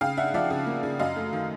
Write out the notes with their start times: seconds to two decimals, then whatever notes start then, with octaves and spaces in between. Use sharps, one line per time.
0.01 C#3 F5 G5
0.17 D4 E5 F#5
0.34 F3 D5 E5
0.50 C#3
0.66 A#3
0.83 C#3
0.99 F#2 D#5 F5
1.16 A3
1.33 D#3